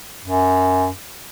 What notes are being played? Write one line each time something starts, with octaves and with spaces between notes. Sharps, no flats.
F#2